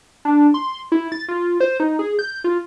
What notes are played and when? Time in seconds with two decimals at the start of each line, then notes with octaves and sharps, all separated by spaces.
0.25 D4
0.54 C6
0.92 E4
1.12 A6
1.28 F4
1.60 C5
1.80 D#4
1.99 G#4
2.19 G6
2.44 F4